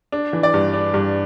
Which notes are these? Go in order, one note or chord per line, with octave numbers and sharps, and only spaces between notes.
D4
E3
D5
G2
D4
G2